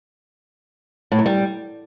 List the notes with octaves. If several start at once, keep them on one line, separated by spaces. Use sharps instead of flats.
A2
F#2
G3